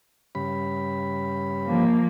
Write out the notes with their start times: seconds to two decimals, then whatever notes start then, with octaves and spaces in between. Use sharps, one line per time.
0.35 G2 C#3 B5
1.67 F3 A#3